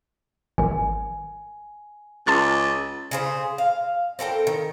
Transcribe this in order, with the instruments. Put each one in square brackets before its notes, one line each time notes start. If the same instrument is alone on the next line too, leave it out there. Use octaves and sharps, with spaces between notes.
[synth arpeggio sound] G#1 D#3 [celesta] G#5
[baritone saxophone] C#2 [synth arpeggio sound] A5 C6 F6 [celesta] A6
[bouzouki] C#3 G#4 C5
F5
C4 A4 A#4 G5
D#3